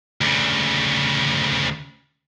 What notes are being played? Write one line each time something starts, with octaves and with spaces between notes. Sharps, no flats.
D2 C#3